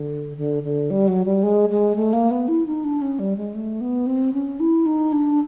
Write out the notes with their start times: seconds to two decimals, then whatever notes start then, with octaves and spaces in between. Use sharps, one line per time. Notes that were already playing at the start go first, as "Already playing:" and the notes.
Already playing: D3
0.37 D3
0.63 D3
0.90 G3
1.08 F#3
1.25 G3
1.43 G#3
1.70 G#3
1.96 A3
2.13 A#3
2.31 B3
2.48 E4
2.66 D#4
2.84 D4
3.02 C#4
3.19 G3
3.37 G#3
3.55 A3
3.81 B3
4.07 C4
4.33 C#4
4.60 E4
4.86 D#4
5.12 D4